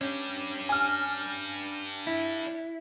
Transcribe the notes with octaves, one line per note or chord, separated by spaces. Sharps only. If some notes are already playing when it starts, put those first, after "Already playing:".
C#4 D4 G4
G#5 F6
E4